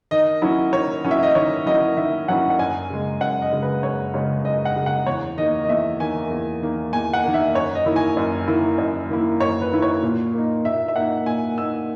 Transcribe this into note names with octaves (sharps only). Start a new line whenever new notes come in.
D#3 D#5
F#3 C#4 E4
D#3 C#5
F#3 C#4 E4
E5
D#5
D#3 C#5
F#3 C#4 E4 D#5
D#3 E5
F#3 C#4 E4 F#5
F#5
F#2 G#5
C#3 G#3
F#2 F#5
D#5
C#3 G#3
B4
F#2 C#5
C#3 G#3 C#5
F#2 D#5
F#5
C#3 G#3
F#5
E2 C#5
D#3 A#3 D#5
D#5
E2 E5
D#3 A#3 G#5
E2
D#3 A#3
E2 G#5
F#5
D#3 A#3
E5
F#2 C#5
D#5
D#3 A#3 E4
G#5
F#2
D#3 A#3 E4
F#2
D#3 A#3 E4
F#2 C#5
B4
D#3 A#3 E4
C#5
A#2
A#3 D#4
A#2 E5
E5
A#3 D#4 F#5
A#2 G#5
A#3 D#4 E6